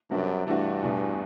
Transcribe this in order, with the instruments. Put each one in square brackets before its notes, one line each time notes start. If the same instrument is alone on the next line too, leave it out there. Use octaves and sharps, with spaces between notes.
[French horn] F#2 [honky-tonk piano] C3 G3 B3 D4 F#4
[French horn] G2 [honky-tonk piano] E3 A3 D4 F#4
[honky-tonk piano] E2 B2 A3